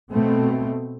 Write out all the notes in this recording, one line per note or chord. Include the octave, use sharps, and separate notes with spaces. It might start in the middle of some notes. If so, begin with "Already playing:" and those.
B2 A3 C4